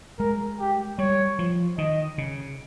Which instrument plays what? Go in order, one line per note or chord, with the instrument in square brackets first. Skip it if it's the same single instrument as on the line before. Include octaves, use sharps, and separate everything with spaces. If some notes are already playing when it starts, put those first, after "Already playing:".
[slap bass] G#3 [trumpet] A#4
[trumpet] G4
[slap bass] G3 [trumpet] C#5
[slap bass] F3
[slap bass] D#3 [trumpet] D#5
[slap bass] C#3